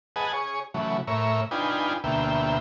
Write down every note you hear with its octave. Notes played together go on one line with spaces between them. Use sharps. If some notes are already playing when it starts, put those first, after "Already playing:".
G#4 B4 D#5 F#5 G#5 A5
G#4 C#5
C#3 E3 F#3 A3
A2 A#4 C#5 E5
D4 D#4 F4 B4 G5 G#5
D2 B2 A#3 E5 G5